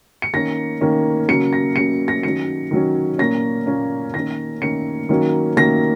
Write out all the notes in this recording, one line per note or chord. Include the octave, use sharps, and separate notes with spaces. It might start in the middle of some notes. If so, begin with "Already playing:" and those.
C#7
D#3 A#3 C#4 A#6
D#3 A#3 C#4
C#3 F#3 A#3 C#4 C#7
A#6
C#3 F#3 A#3 C#4 C#7
A#6
D#3 F#3 C#4 C#7
D#3 F#3 C#4
A#2 A#3 C#4 A#6
A#2 A#3 C#4
D#3 A#3 C#4 A#6
D#3 A#3 C#4 C#7
D#3 F#3 A#3 C#4
D#3 F#3 A#3 C#4 A#6